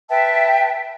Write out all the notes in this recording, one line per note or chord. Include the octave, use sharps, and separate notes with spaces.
B4 E5 G5 A5